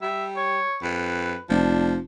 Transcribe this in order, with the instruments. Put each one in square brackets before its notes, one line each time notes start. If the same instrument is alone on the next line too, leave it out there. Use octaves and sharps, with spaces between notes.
[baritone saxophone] G3 [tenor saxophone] E5
[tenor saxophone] C#5
[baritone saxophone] F2 [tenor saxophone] B4
[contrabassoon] F1 [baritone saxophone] F3 [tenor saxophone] D4